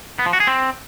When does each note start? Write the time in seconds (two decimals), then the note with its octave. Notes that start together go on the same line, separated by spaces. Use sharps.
0.19 B3
0.26 F3
0.33 F#4
0.40 G#4
0.47 C4